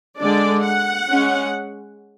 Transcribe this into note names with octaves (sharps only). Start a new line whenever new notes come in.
D3 G#3 D4 D5
F#5
G#3 C#4